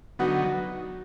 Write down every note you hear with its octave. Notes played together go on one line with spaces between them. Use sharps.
D3 F#3 B3 D#4 F#4 F#5